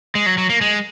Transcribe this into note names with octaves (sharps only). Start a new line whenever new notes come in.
G#3
F#3
F#3
A#3
G#3